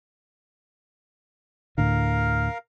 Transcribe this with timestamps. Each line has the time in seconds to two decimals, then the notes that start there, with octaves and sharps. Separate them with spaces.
1.78 D2 A2 D3 A#4 F5